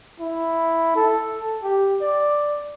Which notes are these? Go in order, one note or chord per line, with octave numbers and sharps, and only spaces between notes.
E4
A4
G4
D5